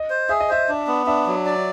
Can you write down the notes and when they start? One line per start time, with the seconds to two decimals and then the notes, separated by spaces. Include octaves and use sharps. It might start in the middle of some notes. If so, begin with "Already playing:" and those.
Already playing: D#5
0.10 C5
0.29 G#4 E5
0.40 D#5
0.49 C5 E5
0.69 D4
0.87 B3
1.06 D4 E5
1.27 F#3
1.46 D5